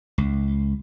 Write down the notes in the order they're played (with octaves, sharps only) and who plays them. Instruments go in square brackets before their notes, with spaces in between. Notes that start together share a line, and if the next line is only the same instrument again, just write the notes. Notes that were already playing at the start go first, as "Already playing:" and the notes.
[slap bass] C#2